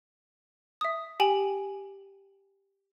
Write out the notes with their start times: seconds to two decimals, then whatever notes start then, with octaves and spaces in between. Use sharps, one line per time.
0.81 E5 D#6
1.20 G4 G5 G#5 F#7